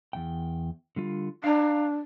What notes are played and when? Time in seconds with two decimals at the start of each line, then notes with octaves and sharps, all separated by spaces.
0.13 E2 G#2 G5
0.96 D3 G3 F4
1.44 D4 F5 A#5